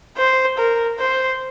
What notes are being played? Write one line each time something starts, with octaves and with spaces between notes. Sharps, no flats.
C5
A#4
C5